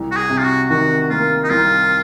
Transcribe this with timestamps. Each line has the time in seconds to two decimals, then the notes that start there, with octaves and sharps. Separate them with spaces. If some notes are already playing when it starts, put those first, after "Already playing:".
Already playing: C2
0.11 F#4
0.16 G#4
0.29 C3
0.38 F4
0.44 F#4
0.70 D#3 F#4
1.10 A#3 F4
1.43 D#4
1.50 C2 F4